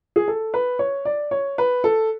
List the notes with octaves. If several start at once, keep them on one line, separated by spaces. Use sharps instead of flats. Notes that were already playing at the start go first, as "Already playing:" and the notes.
G#4
A4
B4
C#5
D5
C#5
B4
A4